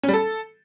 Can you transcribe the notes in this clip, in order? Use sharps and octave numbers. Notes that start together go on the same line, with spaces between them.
C#4
G3
A4